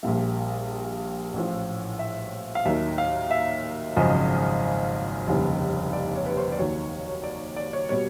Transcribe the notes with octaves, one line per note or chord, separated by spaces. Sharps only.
A#1 A#2 G3 E5
A1 A2 F3
E5
F5
D#2 D#3 F#3 E5
F5
E5
G#1 F#2 C#3 F3 D#5
F1 D#2 C#3 E3 G3
D5
C#5
B4
C5
D5
D#2 D#3 F#3 C#5
D5
D5
C#5
B2 G3 C#5